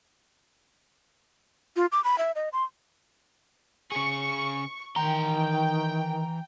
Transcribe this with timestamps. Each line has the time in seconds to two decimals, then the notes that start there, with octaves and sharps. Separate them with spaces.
1.76 F4
1.92 D6
2.04 B5
2.18 E5
2.36 D#5
2.53 C6
3.92 C#3 G#4 C#6
4.96 D#3 E3 G5 A#5 C6